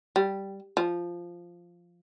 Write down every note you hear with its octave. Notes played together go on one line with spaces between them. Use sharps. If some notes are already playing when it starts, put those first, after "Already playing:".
G3
F3